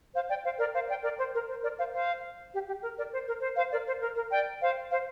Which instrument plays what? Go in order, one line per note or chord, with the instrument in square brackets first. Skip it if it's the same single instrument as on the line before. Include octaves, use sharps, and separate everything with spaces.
[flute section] C5 F5
D5 G5
C5 F5
A#4 D5
C5 F5
D5 G5
A#4 D5
C5
A#4
C5
A#4 D5
C5 F5
C5 F5
G4
G4
A#4
A#4 D5
C5
A#4
C5
C5 F5
A#4 D5
C5
A#4
A#4
D5 G5
C5 F5
C5 F5